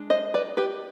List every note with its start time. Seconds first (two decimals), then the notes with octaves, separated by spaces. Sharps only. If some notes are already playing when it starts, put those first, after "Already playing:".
Already playing: G#3 D4
0.10 C5 D#5
0.34 B4 D5
0.57 G4 B4